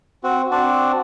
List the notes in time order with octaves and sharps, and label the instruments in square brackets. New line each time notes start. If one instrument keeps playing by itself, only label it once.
[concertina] C4 F#4
C4 D4 F#4 D5